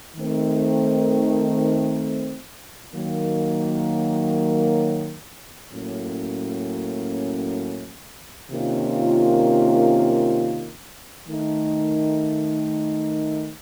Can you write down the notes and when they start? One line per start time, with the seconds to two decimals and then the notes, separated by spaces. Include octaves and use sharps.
0.15 D#3 A3 C4
2.94 D#3 F#3 A#3
5.72 A2 F#3 A#3 C#4
8.51 C3 D#3 A#3 C#4 F4
11.29 D#3 A3 D#4